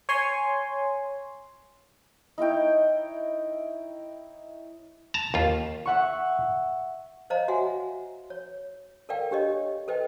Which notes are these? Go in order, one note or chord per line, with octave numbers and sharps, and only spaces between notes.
C#5 G#5 C6
D#4 E4 C#5 G5
A5 A#5
D#2 F4
E5 F#5 C#6
C5 C#5 D#5 F5 A#5
F#4 E5 F#5 G#5
C#5
A4 A#4 D5 F5 G5
D4 G4 C#5 D#5
A4 B4 D#5 G5